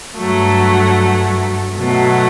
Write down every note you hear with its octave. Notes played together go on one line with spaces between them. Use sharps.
G2 F#3 A3
B2 F#3 A3